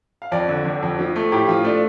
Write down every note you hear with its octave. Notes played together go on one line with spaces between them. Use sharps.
F5
F2 D5
D3
F1
F2
F3
A3
A2 G4
F3 F4
A3 D4